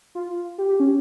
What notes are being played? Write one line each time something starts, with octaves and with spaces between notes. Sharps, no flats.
F4
G4
G4
C#4